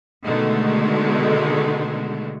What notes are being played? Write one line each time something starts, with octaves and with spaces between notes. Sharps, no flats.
B2 D3 D#3 G#3 A3